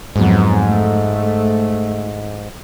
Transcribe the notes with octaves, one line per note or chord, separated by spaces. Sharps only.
F2 G#2 F#3 B3
A3